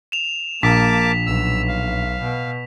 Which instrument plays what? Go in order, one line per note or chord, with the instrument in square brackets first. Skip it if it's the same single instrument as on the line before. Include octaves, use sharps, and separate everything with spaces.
[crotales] E7 F7
[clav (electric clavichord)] A#1 [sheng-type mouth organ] A#3 A5 D6 [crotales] B6
[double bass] B1 [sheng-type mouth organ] E6
[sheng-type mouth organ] F5
[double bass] B2